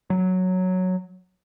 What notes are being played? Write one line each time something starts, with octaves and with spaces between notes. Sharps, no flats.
F#3